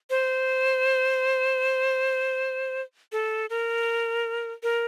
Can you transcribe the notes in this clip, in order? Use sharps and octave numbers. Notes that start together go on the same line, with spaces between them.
C5
A4
A#4
A#4